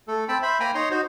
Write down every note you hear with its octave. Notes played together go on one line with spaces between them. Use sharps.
A3 A4
C4 G5 A5 B5 E6
C5 E5 B5
A#3 G5 G#5 A#5 B5
D#4 C#5 A#5 C6
D#4 F#4 C5